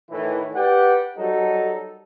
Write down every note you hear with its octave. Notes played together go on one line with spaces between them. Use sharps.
A2 D#3 E3
G4 B4 D5 F#5 G5
F#3 G3 D#4 A4 A#4